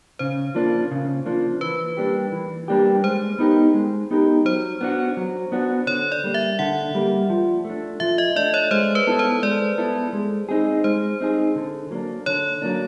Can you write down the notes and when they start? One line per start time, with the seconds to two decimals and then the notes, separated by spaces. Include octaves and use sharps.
0.19 C#3 C5
0.55 F3 A#3 D4
0.91 C#3
1.26 F3 A#3 D4
1.61 E3 B4
1.97 G3 A#3 D4 G4
2.32 E3
2.68 G3 A#3 D4 G4
3.04 G#3 C5
3.39 B3 D#4 G4 A#4
3.74 G#3
4.11 B3 D#4 G4 A#4
4.45 F#3 C5
4.81 B3 D4 F#4
5.17 F#3
5.52 B3 D4 F#4
5.87 D3 C#5
6.12 D5
6.24 G3 A#3
6.34 E5
6.59 D3 F#5
6.95 G3 A#3
7.30 F3
7.65 A3 D4
8.00 F3 E5
8.18 D#5
8.36 A3 D4 D5
8.54 C#5
8.71 G#3 C5
8.95 B4
9.07 B3 E4 A4
9.19 C5
9.43 G#3 D5
9.78 B3 E4 A4
10.13 G#3
10.49 C4 D#4 G#4
10.84 G#3 C5
11.21 C4 D#4 G#4
11.56 D3
11.91 F#3 A#3 D4
12.26 D3 C#5
12.62 F#3 A#3 D4